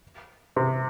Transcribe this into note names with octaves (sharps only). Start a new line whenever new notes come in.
C3